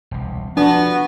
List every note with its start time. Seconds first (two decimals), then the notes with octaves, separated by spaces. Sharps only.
0.11 E1 C2
0.57 F3 B3 D4 F#4